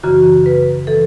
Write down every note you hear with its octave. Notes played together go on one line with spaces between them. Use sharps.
F#2 C#3 E3 F#4
B4
E3 A4